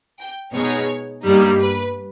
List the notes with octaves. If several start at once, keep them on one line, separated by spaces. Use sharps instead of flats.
G5
B2 G#3 D#4 C#5
G2 G3 A#3 D#4
B4